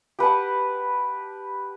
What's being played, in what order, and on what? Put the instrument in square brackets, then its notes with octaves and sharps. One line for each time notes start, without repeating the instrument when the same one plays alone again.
[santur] G4 B4 F#5 A5